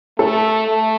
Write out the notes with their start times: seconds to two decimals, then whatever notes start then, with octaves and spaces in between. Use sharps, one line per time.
0.19 A3 A4
0.67 A3